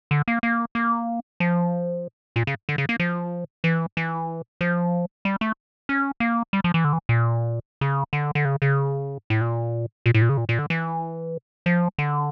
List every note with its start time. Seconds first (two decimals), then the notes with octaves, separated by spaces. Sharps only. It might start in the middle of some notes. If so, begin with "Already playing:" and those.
0.11 D3
0.28 A#3
0.43 A#3
0.75 A#3
1.40 F3
2.36 A#2
2.47 C#3
2.69 D3
2.78 C#3
2.89 A#3
3.00 F3
3.64 E3
3.97 E3
4.61 F3
5.25 G3
5.41 A3
5.89 C#4
6.20 A#3
6.53 G3
6.64 F3
6.74 E3
6.84 D3
6.93 E3
7.09 A#2
7.81 C#3
8.13 D3
8.35 D3
8.45 C#3
8.62 C#3
9.30 A2
9.41 A#2
10.06 A#2
10.14 A2
10.22 A#2
10.29 C#3
10.37 A#2
10.49 A#2
10.59 D3
10.70 E3
11.66 F3
11.98 D3